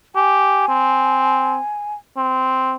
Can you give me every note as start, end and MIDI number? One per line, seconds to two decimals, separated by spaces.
0.15 0.67 67
0.15 1.94 80
0.69 1.58 60
2.17 2.75 60